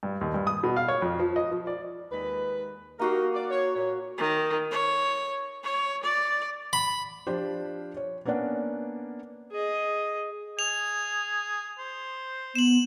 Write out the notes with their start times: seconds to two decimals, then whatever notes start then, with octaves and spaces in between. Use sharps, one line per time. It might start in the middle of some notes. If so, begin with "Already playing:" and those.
0.03 G2
0.21 D#2
0.34 G2
0.47 D#6
0.63 B2
0.76 F5
0.88 C#5
1.02 F2
1.19 F3
1.36 D#5
1.51 F3
1.67 D5
2.12 D#2 G#3 B4
2.99 A#3 D#4 F#4 G4 A#4 F5
3.34 D5
3.51 C#5
3.75 A#2 C#5
4.18 D#3
4.71 C#5
5.64 C#5
6.03 D5
6.73 B5
7.27 F3 D4 F4 G4 C5
7.97 C#5
8.25 A#3 B3 C#4 D4 D5 F#5
9.52 G#4 D#5
10.59 G#4 F7
11.78 C5
12.55 B3 E7 F#7